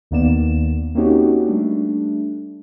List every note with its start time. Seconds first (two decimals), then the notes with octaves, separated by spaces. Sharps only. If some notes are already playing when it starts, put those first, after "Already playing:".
0.11 D#2 D#3 A#3 B3 D5 E7
0.95 A#3 C4 C#4 D#4 F#4 G4
1.47 G3 A3 D4